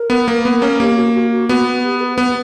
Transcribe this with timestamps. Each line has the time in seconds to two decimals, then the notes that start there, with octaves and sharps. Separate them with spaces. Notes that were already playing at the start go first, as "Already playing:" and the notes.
Already playing: A#4
0.10 B3
0.28 A#3
0.45 B3
0.62 A#3 C#4
0.79 A#3 G4
0.96 F#4
1.14 F#4
1.32 F#4
1.49 B3 F#4
1.84 G4
2.01 B4
2.18 B3 B4